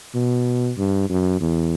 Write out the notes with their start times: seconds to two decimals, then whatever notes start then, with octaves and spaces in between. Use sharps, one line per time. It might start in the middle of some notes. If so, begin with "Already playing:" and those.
0.15 B2
0.78 G2
1.10 F#2
1.41 E2